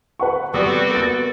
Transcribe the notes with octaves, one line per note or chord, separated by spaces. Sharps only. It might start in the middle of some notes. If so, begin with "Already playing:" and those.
B4 F#5 C#6
G3 B3 C4 F#4 A4 D6
A#3 A6